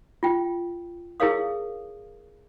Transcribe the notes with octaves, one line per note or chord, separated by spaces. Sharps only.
F4 G5
E4 G#4 A#4 C#5 F5 D#6